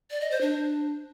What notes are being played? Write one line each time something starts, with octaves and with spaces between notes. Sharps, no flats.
D5
D#5
C5
D4